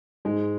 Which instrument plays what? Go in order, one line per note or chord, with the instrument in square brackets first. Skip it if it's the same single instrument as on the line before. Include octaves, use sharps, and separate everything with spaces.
[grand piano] G#2 [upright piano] G#3